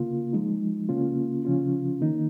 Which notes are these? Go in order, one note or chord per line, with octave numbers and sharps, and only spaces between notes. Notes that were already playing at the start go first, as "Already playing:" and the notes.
Already playing: C#3 A#3 F4
F3 G#3 D#4
C#3 A#3 C#4 F4
C#3 F3 C#4 F4
D#3 A#3 D#4